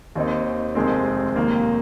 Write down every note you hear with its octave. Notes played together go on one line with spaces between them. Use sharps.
D#2 D#3 C4 D#4
F1 F2 D#3 G#3 C4
F1 D#2 D#3 A#3